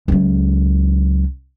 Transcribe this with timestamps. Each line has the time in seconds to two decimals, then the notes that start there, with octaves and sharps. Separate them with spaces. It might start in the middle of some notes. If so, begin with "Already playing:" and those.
0.08 C#2 F#3